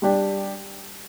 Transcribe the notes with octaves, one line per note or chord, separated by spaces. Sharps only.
G3 D4 G4 D5